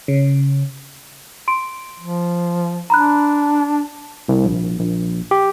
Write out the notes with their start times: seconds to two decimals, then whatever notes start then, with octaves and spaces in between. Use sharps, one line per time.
0.08 C#3
1.48 C6 D7
1.99 F3
2.90 D4 A#5 B5 F#6
4.29 C2
4.45 A#1
4.79 A#1
5.31 G4